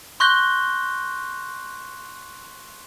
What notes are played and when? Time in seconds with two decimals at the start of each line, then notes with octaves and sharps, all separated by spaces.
0.20 C6 C#6 F#6 G6 A#6 G7